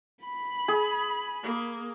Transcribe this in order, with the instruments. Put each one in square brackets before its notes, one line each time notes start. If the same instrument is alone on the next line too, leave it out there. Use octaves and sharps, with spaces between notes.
[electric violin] B5
[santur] G#4
[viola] A#3